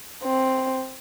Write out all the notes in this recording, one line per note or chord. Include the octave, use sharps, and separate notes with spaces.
C4